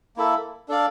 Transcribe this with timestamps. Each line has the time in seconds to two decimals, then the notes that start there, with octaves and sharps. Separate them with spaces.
0.16 A#3 E4 A4 E5
0.68 D4 A4 D5 F5